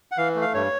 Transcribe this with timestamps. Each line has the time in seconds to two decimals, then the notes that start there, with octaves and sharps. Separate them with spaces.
0.12 F#5
0.17 E3 F5
0.35 A3
0.42 F5
0.54 G2 C#5